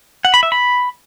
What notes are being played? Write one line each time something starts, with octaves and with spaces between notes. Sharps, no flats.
F#5
B5
E5
B5